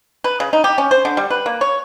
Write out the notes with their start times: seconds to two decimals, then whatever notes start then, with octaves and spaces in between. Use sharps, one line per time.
0.24 B4
0.40 C#3
0.53 D#4
0.64 G4
0.78 C#4
0.91 C5
1.05 D3
1.17 G3
1.30 B4
1.46 A#3
1.61 C#5